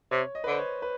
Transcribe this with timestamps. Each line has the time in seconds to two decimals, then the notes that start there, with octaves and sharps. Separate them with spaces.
0.11 C3 C#5
0.35 D#5
0.44 B4
0.47 D3 C5
0.58 C#5
0.82 B4